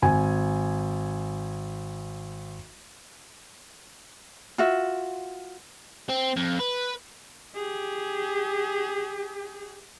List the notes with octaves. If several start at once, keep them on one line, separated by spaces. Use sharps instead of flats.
G#1 G#5
F4 F#4 E5
C4
F2
B4
G4 G#4